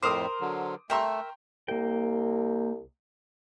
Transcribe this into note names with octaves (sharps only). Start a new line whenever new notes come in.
F2 A2 A#4 C5 D6 D#6
D3 F#3
A3 A#4 E5 G5 A#5 C6 C#6
C2 A#3 G5